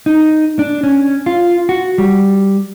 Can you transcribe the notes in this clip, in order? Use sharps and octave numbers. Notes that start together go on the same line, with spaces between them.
D#4
D4
C#4
F4
F#4
G3